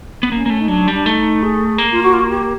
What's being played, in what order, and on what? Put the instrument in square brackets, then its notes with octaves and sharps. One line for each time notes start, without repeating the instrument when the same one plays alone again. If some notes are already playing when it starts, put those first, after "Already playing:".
[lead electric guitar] B3
[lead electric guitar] A#3 [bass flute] C#4
[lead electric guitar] A#3
A3
[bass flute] D#4
[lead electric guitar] F#3 [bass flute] D4
[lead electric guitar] G3
[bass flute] D4
[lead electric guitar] A3 [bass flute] D#4
[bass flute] G#4
[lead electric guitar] A#3
[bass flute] F4
F#4
F4
F#4
G4